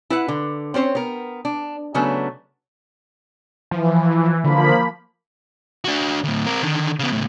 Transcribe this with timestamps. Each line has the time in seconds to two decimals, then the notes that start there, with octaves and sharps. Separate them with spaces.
0.10 E4 B4 F#5
0.28 D3
0.74 C4 C#4 C5 C#5
0.95 B3 A#4
1.45 D4
1.94 C#3 F#3 A3 B3 D4
3.71 E3 F3
4.44 D3 F3 A#3 B5
5.85 D4 F#4
6.24 D2 A2
6.46 C4 A#4
6.62 D3 D#3
6.99 C#3 B3
7.12 C#2 A2